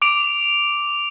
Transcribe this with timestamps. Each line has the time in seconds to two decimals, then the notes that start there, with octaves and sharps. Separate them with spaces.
0.02 D6 D7 F7